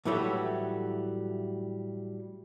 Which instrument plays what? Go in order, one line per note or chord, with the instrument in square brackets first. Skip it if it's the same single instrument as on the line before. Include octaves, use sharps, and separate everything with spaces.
[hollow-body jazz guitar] A2 E3 F#3 G3 A3